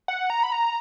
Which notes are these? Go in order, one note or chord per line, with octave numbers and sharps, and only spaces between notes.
F#5
A#5
B5
A#5